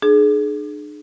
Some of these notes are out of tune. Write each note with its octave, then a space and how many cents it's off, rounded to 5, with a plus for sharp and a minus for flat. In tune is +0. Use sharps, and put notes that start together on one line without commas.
D4 +40 G#4 +25